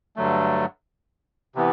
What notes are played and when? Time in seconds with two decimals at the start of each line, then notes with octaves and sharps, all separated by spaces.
0.16 G2 D3 F#3 A3
1.55 C3 E3 B3